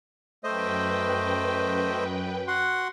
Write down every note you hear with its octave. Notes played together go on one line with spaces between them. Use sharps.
F#2 A3 B4 C5 D#5 G5
F#4 F#5 C6